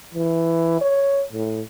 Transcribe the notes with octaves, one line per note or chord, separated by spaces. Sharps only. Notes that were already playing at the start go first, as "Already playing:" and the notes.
E3
C#5
A2